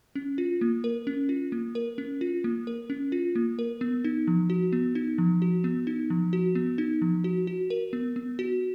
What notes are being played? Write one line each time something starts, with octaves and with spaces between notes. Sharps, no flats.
C#4
F4
A#3
A#4
C#4
F4
A#3
A#4
C#4
F4
A#3
A#4
C#4
F4
A#3
A#4
B3
D#4
F3
F#4
B3
D#4
F3
F#4
B3
D#4
F3
F#4
B3
D#4
F3
F#4
F#4
A#4
B3
B3
F#4